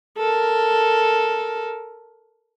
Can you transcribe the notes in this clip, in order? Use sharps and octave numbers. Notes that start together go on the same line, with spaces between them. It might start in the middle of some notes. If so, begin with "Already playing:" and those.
A4 A#4